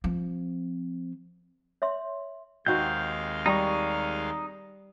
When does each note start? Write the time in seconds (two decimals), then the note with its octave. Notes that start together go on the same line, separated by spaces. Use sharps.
0.04 F3 C4
1.82 C#5 E5 C6
2.66 D#2 G#3 C4 D#4 F#4 F5 G6
3.46 G3 D#4 A#5 C#6